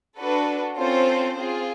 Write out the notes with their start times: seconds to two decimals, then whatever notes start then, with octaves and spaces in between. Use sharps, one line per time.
0.18 D4 F#4 A4 B4
0.78 C4 C#4 F4 A4 C5
1.37 C4 F4 G#4